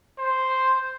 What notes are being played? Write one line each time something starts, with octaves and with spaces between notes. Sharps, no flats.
C5